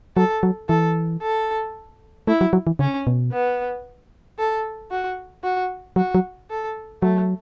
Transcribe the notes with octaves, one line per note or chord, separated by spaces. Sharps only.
F#3 A4
F#3
E3 A4
A4
A3 E4
F#3
F#3
E3
C#3 C#4
B2
B3
A4
F#4
F#4
F#3 F#4
F#3
A4
F#3 A3